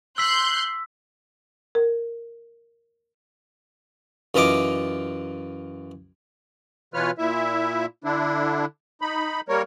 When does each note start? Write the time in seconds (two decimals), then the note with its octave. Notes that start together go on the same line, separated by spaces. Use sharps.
0.18 C6 E6 F#6 G6 B6
1.75 A#4
4.34 F#2 E3 F4 D#5 A#5 D6
6.94 B2 E3 F4 B4 C#5 F6
7.18 A#2 E4 E5
8.04 D3 D4 E4
9.01 D#4 B5
9.49 G3 A#3 A#4 C#5